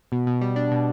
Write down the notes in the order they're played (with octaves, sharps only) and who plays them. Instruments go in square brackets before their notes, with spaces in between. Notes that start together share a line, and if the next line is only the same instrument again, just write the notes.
[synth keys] B2
B2
G3
D4
B2